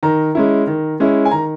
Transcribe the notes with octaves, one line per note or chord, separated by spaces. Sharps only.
D#3 A#5
G#3 C#4 E4
D#3
G#3 C#4 E4
G#5
D#3 A#5